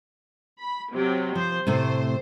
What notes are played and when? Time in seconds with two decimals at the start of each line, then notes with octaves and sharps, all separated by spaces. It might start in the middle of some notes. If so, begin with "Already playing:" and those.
0.59 B5
0.91 C3 F#3
1.35 F3 C5
1.67 A2 C3 A3 C5